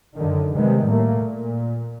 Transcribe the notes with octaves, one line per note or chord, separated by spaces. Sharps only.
F#2 D3 D#3
C3 D#3 G3 G#3 B3
A2 A3 A#3
A#2